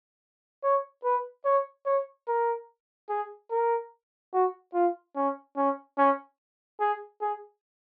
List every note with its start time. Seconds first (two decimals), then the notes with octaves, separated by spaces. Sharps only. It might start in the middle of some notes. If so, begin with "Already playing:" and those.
0.64 C#5
1.04 B4
1.45 C#5
1.86 C#5
2.28 A#4
3.10 G#4
3.51 A#4
4.33 F#4
4.74 F4
5.16 C#4
5.57 C#4
5.98 C#4
6.80 G#4
7.21 G#4